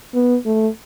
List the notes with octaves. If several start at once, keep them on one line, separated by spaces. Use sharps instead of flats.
B3
A3